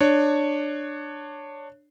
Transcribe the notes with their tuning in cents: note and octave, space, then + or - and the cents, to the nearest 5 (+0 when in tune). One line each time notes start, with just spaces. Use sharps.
D4 +15 C#5 +0